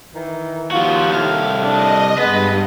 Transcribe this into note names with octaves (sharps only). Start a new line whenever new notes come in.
D#3 E3
D#2 F3 F4 F#4
C2 A2 F5
D4 D#5
G2 G#3 B3 B4